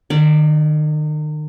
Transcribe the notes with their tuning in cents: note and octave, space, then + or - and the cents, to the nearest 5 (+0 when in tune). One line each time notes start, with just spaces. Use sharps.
D#3 -35 D5 +0 A#5 +0